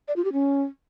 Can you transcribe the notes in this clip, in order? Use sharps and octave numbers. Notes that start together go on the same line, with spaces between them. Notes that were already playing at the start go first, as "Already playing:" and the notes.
D5
F4
G4
C#4